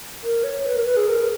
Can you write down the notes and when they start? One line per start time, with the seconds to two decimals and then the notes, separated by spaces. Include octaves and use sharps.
0.23 A#4
0.44 C#5
0.65 B4
0.76 A#4
0.86 B4
0.97 G#4
1.07 A#4